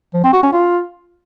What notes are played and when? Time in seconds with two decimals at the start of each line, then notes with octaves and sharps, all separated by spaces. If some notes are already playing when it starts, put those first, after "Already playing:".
0.14 F3
0.24 C4
0.33 F#4
0.43 C#4
0.53 F4